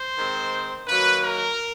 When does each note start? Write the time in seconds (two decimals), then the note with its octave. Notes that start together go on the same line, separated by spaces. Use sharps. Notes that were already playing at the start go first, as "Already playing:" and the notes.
Already playing: C5
0.18 D#3 G#3 C4
0.87 D#3 F#3 A#3 B4
1.22 A#4